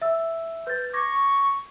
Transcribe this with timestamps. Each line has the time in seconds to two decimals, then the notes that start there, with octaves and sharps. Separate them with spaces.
0.02 E5 E6
0.67 B4 G6 A6
0.93 C#6 D6 G#6 A#6